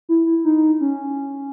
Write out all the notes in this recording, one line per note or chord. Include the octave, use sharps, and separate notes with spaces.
E4
D#4
C#4